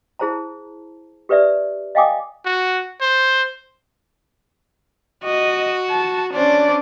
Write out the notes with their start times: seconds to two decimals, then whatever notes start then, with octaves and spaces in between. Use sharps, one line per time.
0.19 E4 G#4 C5 A5 A#5
1.29 G4 A#4 B4 D5 E5
1.95 D#5 F5 G5 G#5 D6 D#6
2.45 F#4
3.01 C5
5.24 F#4 D#5
5.90 A5
6.33 C#4 D4 C5 D5